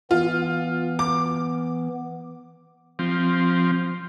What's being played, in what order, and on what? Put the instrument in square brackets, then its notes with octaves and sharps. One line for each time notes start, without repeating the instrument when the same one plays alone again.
[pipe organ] E3 B3 [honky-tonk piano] F4
[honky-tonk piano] D6
[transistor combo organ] F3 C4